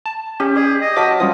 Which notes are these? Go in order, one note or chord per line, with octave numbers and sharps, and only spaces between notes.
A5
C#4 G4
G#4 D5
D#5
F#3 F5 A5 D6 B6
F3 G3 C#4 D#6